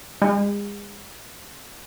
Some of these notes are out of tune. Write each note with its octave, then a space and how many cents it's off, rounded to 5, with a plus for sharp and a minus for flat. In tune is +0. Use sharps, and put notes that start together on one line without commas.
G#3 -35